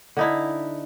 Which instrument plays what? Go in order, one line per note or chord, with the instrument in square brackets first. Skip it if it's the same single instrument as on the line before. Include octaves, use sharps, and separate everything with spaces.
[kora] D3 D#4 E4